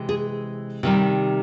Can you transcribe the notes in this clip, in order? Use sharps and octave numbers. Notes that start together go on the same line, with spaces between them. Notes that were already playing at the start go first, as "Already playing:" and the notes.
Already playing: C3 E3 G#3
G#4
C3 D#3 G3